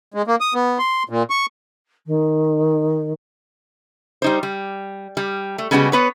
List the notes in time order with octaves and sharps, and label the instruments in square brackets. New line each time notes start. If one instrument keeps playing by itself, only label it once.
[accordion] G#3
A#3
D#6
B3
C6
A#2
C#6
[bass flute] D#3
[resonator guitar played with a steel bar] G3 D#4 C5
G3
G3
A3
C#3 G3 G#3 B3 F4 F#4
B3 B4 C#5